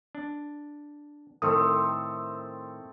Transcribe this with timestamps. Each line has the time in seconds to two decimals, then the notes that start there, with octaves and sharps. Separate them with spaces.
0.15 D4
1.42 A2 D#3 A3 C4 A4 D#6